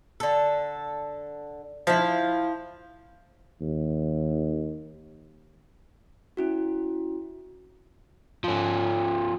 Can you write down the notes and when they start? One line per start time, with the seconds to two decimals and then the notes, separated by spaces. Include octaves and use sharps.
0.20 D3 A4
1.87 F3 E4 F5
3.61 D#2
6.37 C#4 E4 F#4
8.44 F3 C#4